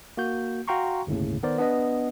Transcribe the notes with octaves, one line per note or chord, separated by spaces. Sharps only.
A#3 F#4 G6
F#4 F5 G5 A#5 C6 C#6
G1 D#2 A2 C#3
D#3 B3 A#4 C5 D5
B3 D4 B4 D#5